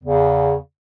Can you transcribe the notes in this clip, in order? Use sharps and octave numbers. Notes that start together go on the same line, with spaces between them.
E2 C#3